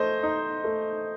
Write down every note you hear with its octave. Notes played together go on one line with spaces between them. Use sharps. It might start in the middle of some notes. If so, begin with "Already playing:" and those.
Already playing: A3 C5 D#5
D#4
A3